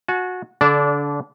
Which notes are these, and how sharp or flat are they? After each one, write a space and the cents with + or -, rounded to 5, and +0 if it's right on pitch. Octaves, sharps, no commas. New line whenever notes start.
F#4 -20 G#5 +45
D3 -30 D4 -20 D5 +0